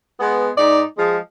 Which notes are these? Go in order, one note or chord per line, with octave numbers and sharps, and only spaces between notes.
G#3 B3
G#2 D#4 D5
F3 G#3